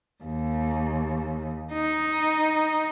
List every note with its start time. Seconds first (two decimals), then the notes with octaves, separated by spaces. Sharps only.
0.24 D#2
1.73 D#4